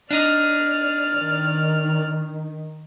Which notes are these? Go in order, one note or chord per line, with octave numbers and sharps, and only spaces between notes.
D4 D#4 D5 F6
D#3